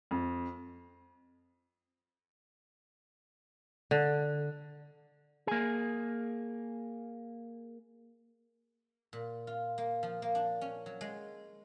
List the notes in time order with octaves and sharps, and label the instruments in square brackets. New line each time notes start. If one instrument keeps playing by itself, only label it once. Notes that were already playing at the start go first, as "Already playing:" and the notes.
[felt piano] F2
[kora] D3
[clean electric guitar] A#3 G#4
[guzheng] A#2
F4
A#3
F3
A#3
D4
C#4
F#3
G#3